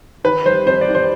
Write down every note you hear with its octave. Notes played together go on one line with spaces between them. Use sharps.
D#3 B4
G3 C5
F2 C5
D5
D#3
C5